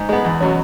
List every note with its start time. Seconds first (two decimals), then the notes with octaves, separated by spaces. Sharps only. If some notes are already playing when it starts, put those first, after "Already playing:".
Already playing: G#2
0.09 G#3 B3
0.25 E2
0.41 B2 F#3 C#4